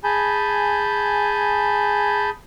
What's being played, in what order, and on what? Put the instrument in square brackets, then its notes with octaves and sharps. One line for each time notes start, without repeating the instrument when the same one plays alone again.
[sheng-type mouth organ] G#4 G#5 A5 B5 G6